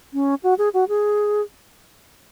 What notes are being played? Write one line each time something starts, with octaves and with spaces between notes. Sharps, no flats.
C#4
F#4
G#4
F#4
G#4